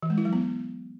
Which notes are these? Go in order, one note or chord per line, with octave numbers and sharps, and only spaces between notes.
E3
G#3
E4
F#3
B3